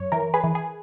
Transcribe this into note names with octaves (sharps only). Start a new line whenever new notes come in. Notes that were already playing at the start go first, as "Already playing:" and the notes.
Already playing: F#2 C#5
E3 A#4
G#4 B4
E3
G#4